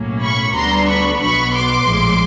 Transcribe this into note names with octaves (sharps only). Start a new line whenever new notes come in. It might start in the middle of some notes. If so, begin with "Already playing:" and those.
Already playing: B1 A2 F#3 A#3 C#4
B5 C#6
D2 D3 G3 B3 D4 A#5 C6
B5 C#6
B1 B2 F#3 B3 B5 C#6
C6 D6
A#1 A2 F3 G#3